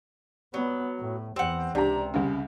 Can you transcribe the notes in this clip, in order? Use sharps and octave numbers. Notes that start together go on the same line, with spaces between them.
F#3 B3
A2
E2 C4 F#5
C#2 C3 D4 A#5
C2 C#3